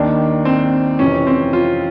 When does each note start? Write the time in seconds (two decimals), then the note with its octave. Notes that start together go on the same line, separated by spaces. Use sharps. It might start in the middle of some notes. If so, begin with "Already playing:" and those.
Already playing: D#2 D#3 D4
0.45 C4
0.99 F2 C3 E3 C#4
1.27 C4
1.53 F4